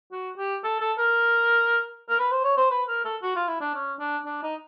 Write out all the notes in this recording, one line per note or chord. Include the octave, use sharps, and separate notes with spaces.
F#4
G4
A4
A4
A#4
A#4
B4
C5
C#5
C5
B4
A#4
A4
F#4
F4
E4
D4
C#4
D4
D4
D#4